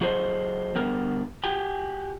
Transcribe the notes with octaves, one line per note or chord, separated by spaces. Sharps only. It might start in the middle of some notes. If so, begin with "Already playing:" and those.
F#3 F#4 G#4 A4 C5 D#5
D3 G3 B3 A#4
F#4 G4 G5 G#5